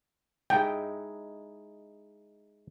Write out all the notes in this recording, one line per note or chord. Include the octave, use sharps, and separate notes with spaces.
G#3 D#4 E4 G5